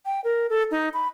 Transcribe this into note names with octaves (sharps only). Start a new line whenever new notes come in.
G5
A#4
A4
D#4
B5